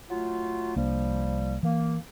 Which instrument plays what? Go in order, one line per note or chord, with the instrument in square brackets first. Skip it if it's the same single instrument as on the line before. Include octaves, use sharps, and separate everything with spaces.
[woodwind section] F#3 A3 F4
[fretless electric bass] C2 A#3 D4 [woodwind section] F3 G3
[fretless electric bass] E3 [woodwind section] A#3